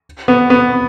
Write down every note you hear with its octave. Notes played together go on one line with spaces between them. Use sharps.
B3
B3